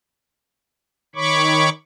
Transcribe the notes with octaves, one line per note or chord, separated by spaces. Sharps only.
D#3 C#5 B5 C#6 D6